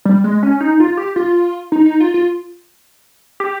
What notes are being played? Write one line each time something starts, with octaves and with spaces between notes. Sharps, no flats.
G3
G#3
C#4
D#4
F4
G4
F4
D#4
D#4
F4
F4
G4